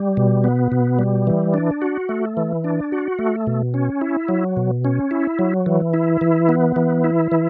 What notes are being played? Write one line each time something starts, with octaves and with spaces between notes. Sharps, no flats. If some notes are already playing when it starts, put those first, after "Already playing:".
Already playing: G3
B2
B3
B2
G3
E3
D4
F#4
A3
E3
D4
F#4
A3
B2
C#4
E4
F#3
B2
C#4
E4
F#3
E3
E4
E3
B3
E3
E4
E3